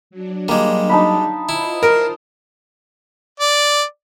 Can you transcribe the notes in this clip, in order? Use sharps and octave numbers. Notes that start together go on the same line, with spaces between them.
F#3 D4
G3 G#3 A#3
D#4 A5 B5
E4 F4 C5
A#4
D5